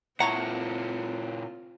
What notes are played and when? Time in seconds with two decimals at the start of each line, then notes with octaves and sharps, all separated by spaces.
0.20 A#2 C4 E4 F4 A4 C#5 F#5 A#5